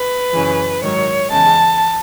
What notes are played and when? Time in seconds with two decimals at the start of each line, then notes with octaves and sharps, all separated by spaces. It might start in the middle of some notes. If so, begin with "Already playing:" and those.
Already playing: B4
0.33 F#2 C#3 E3
0.82 G#2 D#3 F#3 C#5
1.29 E2 C#3 G#3 A5